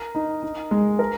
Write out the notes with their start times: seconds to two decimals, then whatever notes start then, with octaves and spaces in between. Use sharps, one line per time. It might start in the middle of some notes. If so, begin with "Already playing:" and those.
Already playing: A#4
0.15 D#4
0.43 D#4
0.71 G#3
0.99 A#4